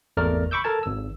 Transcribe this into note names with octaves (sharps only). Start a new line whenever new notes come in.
G#1 E2 A3 A#4 D5 F6
B5 C#6 D6 E6 G6
A4 A#4 A5 G#6
G#1 E6